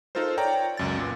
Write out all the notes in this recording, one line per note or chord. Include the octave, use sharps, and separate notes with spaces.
D#4 F4 A4 A#4 C5
C#5 D5 G5 A#5
C#2 F#2 A6
A#2 B3